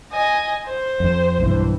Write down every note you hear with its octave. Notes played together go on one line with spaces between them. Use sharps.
D#5 G#5
C5
F2
B1 G2 E3